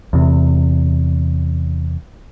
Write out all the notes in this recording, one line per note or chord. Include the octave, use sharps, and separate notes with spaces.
E2 C3